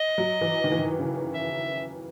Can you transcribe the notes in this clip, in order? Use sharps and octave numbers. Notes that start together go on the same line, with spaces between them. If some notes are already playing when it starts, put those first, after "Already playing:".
Already playing: D#5
F#3
E3
D#3
E3
D#3
C#3
E5